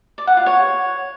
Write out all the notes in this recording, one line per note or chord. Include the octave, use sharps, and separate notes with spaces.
D5
F#5
F4
C#5